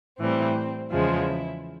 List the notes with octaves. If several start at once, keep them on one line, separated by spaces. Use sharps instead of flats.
A2 E3 G3 C4
E2 C#3 F3 G#3 E4